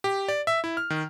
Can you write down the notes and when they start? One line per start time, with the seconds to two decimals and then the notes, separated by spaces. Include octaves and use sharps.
0.04 G4
0.28 D5
0.47 E5
0.64 E4
0.77 F6
0.90 D#3